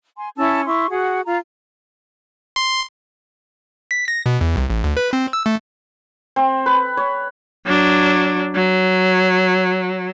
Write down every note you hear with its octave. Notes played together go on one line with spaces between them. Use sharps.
G#5 C6
C#4 E4 A5 E6
E4 C6 C#6
F#4 G#4 F#5
F4 A#5
C6
B6
A#6
B2
E2
C2
A1
D2
B4
C4
E6
A3
C4
B4
C#5
F#3 D4
F#3